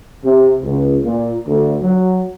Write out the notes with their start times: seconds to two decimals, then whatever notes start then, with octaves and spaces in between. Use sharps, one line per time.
0.25 C3
0.63 C#2
1.04 A#2
1.47 D2
1.82 F#3